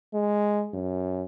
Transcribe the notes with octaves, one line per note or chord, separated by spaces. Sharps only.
G#3
F#2